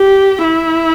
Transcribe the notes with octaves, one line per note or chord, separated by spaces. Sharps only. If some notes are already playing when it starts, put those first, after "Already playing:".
Already playing: G4
E4